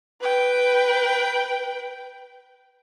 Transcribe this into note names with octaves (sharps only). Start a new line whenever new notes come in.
B4 G5